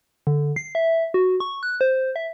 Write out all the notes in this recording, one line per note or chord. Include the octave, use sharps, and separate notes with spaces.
D3
C7
E5
F#4
C#6
F#6
C5
E5